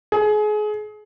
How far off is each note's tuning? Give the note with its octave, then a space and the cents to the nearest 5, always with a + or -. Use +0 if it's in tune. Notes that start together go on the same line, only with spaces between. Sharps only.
G#4 +30